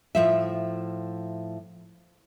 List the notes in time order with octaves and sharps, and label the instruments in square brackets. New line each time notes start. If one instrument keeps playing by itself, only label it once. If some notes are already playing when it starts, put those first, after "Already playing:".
[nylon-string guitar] A2 F3 E5